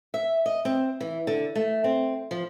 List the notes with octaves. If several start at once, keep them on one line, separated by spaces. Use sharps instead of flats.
E5
D#5
C4
E3
D3
A3
C4
F3